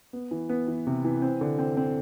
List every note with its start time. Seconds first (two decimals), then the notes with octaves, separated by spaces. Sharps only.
0.13 B3
0.31 E3
0.49 B3
0.68 E3
0.87 C3
1.05 E3
1.22 C4
1.41 D3
1.59 C4
1.77 C4